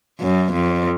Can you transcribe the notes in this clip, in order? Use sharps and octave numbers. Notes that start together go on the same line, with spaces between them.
F#2
F2